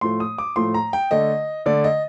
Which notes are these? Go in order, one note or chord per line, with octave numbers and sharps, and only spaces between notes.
A2 F3 A3 C6
D#6
D6
A2 F3 A3 C6
A#5
G5
D3 A3 D#5
D3 A3 D5
D#5